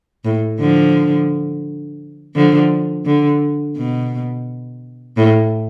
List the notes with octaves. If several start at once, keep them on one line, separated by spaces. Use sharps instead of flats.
A2
D3 F3
D3 F3
D3
B2
A2